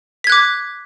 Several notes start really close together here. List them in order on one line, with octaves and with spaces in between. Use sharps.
B6 G#6 F#6 D6